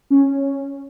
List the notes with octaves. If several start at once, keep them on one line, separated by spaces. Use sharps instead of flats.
C#4